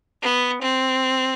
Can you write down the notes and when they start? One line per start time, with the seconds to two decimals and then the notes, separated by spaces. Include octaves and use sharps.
0.23 B3
0.62 C4